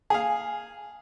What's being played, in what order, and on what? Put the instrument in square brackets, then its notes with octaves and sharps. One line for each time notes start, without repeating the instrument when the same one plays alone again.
[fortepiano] G#4 F5 [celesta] G#5